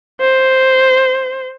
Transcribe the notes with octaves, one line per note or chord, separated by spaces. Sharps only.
C5